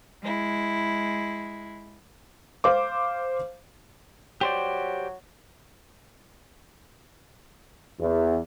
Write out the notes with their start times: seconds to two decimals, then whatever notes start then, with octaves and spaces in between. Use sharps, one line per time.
0.23 G#3 E4
2.64 C5 F5 D6
4.41 F#3 G4 C5 D5
8.00 E2